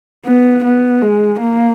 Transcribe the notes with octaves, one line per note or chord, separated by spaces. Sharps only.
B3
B3
G#3
A#3